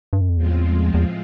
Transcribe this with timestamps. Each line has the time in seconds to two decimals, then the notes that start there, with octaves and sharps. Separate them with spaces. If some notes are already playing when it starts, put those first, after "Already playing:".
0.13 G2
0.21 F#2
0.29 F2
0.37 E2 A2 F3 G#3 C4 F4
0.94 E2